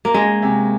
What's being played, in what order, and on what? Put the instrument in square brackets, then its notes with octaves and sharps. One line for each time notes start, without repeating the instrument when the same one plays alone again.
[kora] A#3
[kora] G#3 [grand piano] C#4
[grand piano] C3